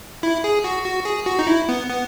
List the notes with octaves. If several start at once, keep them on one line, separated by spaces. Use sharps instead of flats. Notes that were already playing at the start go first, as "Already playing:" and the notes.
E4
G#4
F#4
F#4
G#4
F#4
D#4
E4
B3
B3